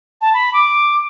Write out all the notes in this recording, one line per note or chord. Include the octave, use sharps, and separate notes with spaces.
A5
B5
D6